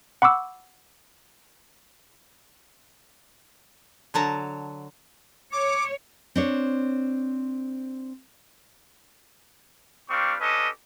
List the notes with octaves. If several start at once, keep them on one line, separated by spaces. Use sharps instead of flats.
F#5 B5 C#6 D6 E6
D3 F#3 A5 A#5
C#5 D6
C4 D4 C#5
G3 C4 D4 F5 C#6 D6
C#4 D4 G4 A4 B4 D#5